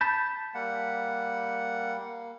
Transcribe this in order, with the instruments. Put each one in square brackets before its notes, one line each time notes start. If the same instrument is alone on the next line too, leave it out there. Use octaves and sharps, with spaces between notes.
[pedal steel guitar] A5 B5 G6
[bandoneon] G3 A#3 F#5
A#3